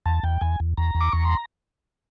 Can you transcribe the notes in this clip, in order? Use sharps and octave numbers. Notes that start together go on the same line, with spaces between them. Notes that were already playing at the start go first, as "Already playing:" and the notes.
E2 A5
E2 G5
E2 G#5
E2
E2 A#5
E2
D6
E2 C#6
C6